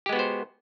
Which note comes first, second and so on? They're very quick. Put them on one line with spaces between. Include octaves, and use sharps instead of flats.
G4 G#3 B3 F#4 C5